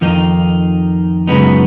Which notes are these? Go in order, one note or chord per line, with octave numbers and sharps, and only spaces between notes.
F2 D#3 A#3 D#4
F#2 C#3 G#3 B3 D#4